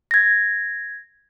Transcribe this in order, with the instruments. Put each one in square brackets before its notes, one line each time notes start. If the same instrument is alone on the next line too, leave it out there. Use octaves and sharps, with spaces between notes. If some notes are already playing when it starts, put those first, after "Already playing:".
[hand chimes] G#6 A#6